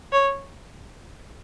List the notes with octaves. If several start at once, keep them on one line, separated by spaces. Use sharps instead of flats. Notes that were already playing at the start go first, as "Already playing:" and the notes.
C#5